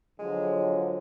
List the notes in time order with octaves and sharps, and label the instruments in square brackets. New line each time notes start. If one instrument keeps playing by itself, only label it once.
[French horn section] D3 F3 F#3 [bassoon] G#3